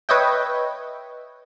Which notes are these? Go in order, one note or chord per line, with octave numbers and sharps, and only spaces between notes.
B4 C#5 D#5 E5 G5